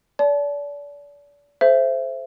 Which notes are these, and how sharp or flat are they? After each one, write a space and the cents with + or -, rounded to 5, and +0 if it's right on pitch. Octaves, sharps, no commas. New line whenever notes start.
D5 -35 A5 -25
A4 -20 C5 +0 E5 +25